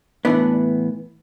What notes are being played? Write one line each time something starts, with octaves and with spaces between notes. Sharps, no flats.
A2 E3 B3 D4